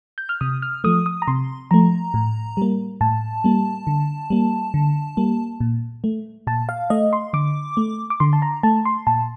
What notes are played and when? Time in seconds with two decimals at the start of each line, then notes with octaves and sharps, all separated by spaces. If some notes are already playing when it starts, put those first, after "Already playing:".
0.18 G6
0.29 F6
0.41 C3 D#6
0.62 F6
0.84 F3 A3 D#6
1.06 D#6
1.22 A#5
1.28 C3 C6
1.71 F3 A3 A#5
2.14 A2
2.57 G3 A#3
3.01 A2 A5
3.44 G3 A#3
3.87 D3
4.30 G3 A#3
4.74 D3
5.17 G3 A#3
5.60 A#2
6.04 A3
6.47 A#2 A5
6.69 F5
6.90 A3 D#5
7.13 C6
7.33 D3 D6
7.77 A3
8.10 D6
8.20 D3 C6
8.33 A5
8.42 A#5
8.63 A3 A5
8.85 C6
9.07 A#2 A5